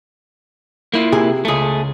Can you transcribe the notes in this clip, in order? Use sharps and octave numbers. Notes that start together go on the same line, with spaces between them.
A#3 E4 F4
C3 G#4 G#5
C#2 G#2 A3 G#4